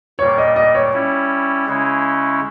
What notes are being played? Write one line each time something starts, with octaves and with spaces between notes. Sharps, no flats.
A#2 G3 A#3 C#5
D#5
D#5
C#5
G3 C#4 E4
C#3 G#3 C#4 E4